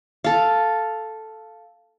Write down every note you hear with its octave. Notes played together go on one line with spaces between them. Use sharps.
A4 F5